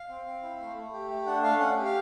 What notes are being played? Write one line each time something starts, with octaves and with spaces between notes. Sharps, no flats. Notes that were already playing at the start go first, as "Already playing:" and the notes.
Already playing: F5
C4
C4
E4
A3
A3
G4
A3
D4 F#5
A3 F5
C#4 F#5
G4
F5